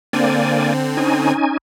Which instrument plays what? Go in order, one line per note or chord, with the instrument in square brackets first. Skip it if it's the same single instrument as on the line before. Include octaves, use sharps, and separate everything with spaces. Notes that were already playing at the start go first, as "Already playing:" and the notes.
[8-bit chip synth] D3 C4 [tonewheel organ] A#3 D5 G#5
[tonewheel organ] C#4 D#4 G#5